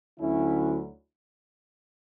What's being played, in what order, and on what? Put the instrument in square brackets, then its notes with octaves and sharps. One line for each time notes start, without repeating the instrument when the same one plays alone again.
[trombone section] D2 D3 F#3 C#4 E4